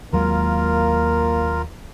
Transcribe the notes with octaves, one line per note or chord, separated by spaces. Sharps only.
D#2 F#3 G#3 A#3 F4 A#4